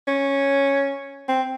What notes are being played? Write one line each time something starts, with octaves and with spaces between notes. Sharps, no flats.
C#4
C4